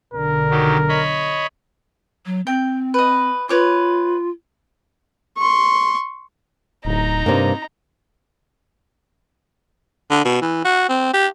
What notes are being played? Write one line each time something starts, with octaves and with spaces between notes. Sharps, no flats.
B1 D3 A#4
D#3 F#3 G4
C#5 D#5 B5
F#3
C4 G5
B4 D#5
F4 B4 C#5 D6
C6 C#6
D1 D#4 A#5
G2 C3 A#3
D3
B2
E3
F#4
C4
G4